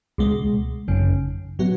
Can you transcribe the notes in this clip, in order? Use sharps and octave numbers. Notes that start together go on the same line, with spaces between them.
C#2 B2 G#3
G#1 F#2 C#3
A2 F#3 B3 F#4